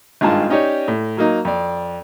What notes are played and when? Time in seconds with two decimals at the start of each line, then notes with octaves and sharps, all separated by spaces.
0.21 G#1 G2 G#3 F4 A5
0.49 C#4 D#4 G4 C#5 D5
0.88 A2
1.17 F#3 A#3 D#4
1.45 F2 D5